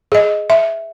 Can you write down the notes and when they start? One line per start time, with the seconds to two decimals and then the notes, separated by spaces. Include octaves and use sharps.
0.12 G#4 D#5
0.50 E5